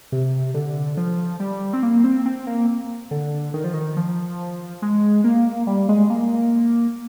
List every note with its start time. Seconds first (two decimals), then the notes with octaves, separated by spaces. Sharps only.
0.12 C3
0.54 D3
0.97 F3
1.40 G3
1.73 C4
1.83 A#3
2.04 C4
2.26 C4
2.47 A#3
3.11 D3
3.54 D#3
3.64 F3
3.74 D#3
3.97 F3
4.82 G#3
5.24 A#3
5.67 G3
5.89 G#3
6.10 A#3